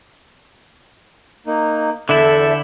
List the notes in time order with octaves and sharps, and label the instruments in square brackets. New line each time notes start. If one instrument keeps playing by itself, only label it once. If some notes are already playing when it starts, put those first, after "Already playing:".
[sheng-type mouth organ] A#3 D#4
[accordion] E2 A4 E5 [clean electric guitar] D3 E4 [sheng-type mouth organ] G6